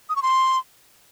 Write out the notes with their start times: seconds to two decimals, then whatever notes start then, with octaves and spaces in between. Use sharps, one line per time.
0.09 D#6
0.16 C#6
0.22 C6